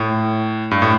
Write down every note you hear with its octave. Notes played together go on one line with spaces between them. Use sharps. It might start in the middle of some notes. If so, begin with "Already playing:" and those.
Already playing: A2
G2
A2